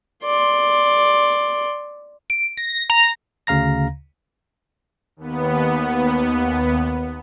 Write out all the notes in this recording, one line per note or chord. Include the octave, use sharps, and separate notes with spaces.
D5 C6
D7
A#6
A#5
D2 C#3 F5 A#5 A#6
D#2 B3